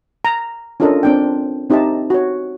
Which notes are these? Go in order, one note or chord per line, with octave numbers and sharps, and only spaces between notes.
A#5
C#4 D4 F4 A4 A#4 D#5
C4 D4 G5
C4 D#4 G4 D#5 E5 A5
F#4 C#5